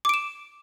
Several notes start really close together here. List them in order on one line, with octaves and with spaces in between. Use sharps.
D6 D7 E7